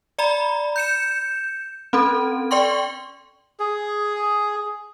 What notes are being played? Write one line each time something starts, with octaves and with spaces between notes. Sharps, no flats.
D5 A#5 B5
G6 C#7 E7
C4 C#4 A4
D5 G5 C6 C#6
G#4